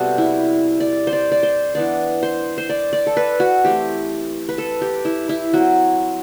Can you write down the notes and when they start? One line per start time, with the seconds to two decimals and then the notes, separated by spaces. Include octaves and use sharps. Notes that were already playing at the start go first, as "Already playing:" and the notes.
Already playing: C3 G3 B3 F#4 A4
0.18 E4
0.80 D5
1.07 C5
1.13 D5
1.32 D5
1.43 C5
1.75 E3 B3 D4 D5
2.23 C5
2.58 C5
2.69 D5
2.93 D5
3.07 A4
3.17 B4
3.40 F#4
3.64 E3 A3 C4 G4
4.49 B4
4.58 A4
4.82 G4
5.05 E4
5.29 E4
5.53 F#3 C4 F#4